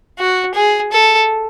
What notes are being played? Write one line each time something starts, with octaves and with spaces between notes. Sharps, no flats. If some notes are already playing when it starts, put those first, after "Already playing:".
F#4
G#4
A4